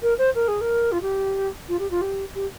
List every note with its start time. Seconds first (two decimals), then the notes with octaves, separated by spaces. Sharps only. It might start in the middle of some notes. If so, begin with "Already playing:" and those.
0.02 A#4
0.18 C5
0.35 A#4
0.48 G#4
0.61 A#4
0.92 F4
1.02 G4
1.69 F4
1.79 G4
1.91 F4
2.01 G4
2.35 G4